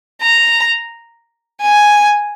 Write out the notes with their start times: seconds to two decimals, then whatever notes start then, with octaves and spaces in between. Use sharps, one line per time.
0.22 A#5
1.62 G#5